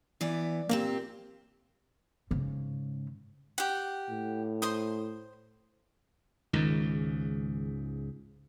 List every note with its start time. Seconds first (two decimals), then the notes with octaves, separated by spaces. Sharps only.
0.21 E3 B3 D5
0.69 A#2 A#3 C4 G4
2.31 G#2 C#3
3.58 G4 F#5
4.09 A2
4.62 C5 C6 D#6
6.53 C#2 G#2 D#3